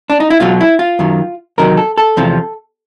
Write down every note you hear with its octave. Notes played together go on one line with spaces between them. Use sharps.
D4
D#4
E4
B1 B2 F#3 F4
E4
F4
F#2 D#3 F#3
E2 C3 D#3 F#3 A#4
A4
A4
E2 C3 F3